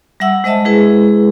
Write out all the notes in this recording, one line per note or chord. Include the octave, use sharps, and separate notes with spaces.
G3 E5 F#5 E6
G#3 C5 D#5 E5 A5
G#3 E4 G#4 B4